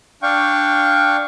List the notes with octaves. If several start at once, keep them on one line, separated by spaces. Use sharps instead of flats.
D4 F5 G5 C#6